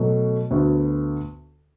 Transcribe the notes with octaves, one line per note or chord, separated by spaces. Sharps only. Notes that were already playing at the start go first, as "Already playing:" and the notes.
Already playing: B2 F#3 A3
D2 D3 B3 F#4